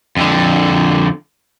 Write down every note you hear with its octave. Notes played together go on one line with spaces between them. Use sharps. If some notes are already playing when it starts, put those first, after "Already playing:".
F2 D3